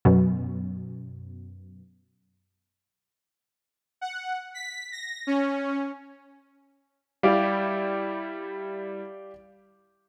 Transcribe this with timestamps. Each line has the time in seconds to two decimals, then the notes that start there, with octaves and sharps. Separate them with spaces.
0.05 F#2 B2
4.01 F#5
4.54 B6
4.92 A#6
5.27 C#4
7.23 G3 E4 G4 D5 F5